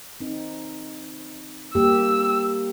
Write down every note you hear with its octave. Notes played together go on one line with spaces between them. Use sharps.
C4 D#4
G3 A#3 G4 E6